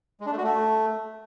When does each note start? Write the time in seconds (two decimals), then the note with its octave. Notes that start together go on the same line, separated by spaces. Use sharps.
0.20 G#3
0.26 D4
0.32 A3
0.38 F#4
0.44 A3